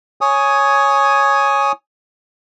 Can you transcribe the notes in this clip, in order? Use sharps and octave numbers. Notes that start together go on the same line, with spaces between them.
C#5 G#5 D#6